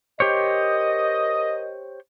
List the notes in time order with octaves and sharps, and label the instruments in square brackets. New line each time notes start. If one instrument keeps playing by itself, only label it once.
[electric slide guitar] G4 C5 C#5 [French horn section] A#4 D#5